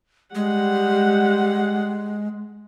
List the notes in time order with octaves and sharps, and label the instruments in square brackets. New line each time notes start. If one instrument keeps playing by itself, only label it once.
[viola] G3 F#5 [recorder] G#3